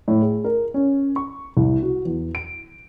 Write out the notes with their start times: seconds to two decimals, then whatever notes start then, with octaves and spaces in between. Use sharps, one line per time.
0.08 A2
0.22 G#4
0.44 A#4
0.74 C#4
1.16 C#6
1.57 C2
1.83 F#4
2.05 E2
2.35 D7